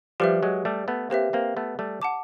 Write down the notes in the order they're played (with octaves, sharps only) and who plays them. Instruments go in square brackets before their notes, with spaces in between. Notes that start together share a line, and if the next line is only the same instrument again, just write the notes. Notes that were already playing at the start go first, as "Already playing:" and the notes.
[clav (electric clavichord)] F3 G3 [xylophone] G4 B4 E5
[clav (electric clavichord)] F#3 G#3
G3 A3
A3 B3
[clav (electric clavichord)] A#3 C4 [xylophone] G4 B4 E5
[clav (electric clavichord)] A#3 C4
A3 B3
G3 A3
[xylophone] F#5 A5 D6